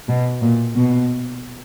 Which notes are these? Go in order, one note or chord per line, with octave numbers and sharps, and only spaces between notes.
B2
A#2
B2